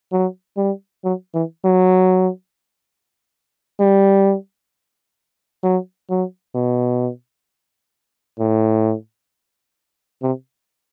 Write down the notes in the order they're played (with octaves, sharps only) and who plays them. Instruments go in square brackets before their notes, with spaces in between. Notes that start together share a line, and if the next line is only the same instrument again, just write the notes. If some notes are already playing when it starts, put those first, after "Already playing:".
[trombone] F#3
G3
F#3
E3
F#3
G3
F#3
F#3
B2
A2
C3